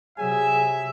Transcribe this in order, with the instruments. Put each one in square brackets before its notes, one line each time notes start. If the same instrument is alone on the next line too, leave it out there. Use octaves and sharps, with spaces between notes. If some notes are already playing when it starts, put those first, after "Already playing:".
[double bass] C3 F#3 [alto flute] G#4 [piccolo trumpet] E5 [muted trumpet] G#5